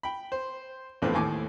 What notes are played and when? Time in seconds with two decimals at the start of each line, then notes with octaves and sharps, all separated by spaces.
0.03 G5 B5
0.32 C5
1.02 A#1 E2 A2 F3 C4 B4
1.14 D#2 A2 G#5 D6